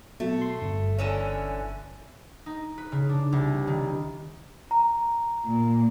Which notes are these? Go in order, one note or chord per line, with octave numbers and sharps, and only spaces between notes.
B2 F#3 A3
C6
G1
D3 E3 C#4
D#4
B4
C#3
D4
C2
D#3
A#5
A#2